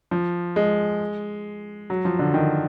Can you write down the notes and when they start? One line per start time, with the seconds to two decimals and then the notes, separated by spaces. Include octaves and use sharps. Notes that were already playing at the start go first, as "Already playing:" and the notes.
0.11 F3
0.56 G#3
1.90 F#3
2.05 F3
2.19 D3
2.34 D#3